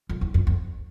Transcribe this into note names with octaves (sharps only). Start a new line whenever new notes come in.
F2
E2
F2
F2